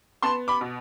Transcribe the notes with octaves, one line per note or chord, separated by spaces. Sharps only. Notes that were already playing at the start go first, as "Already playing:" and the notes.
B3 A5 C6
B5 D6
B2